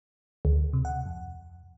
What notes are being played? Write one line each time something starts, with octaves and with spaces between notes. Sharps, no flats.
D2
C3
F#5
F2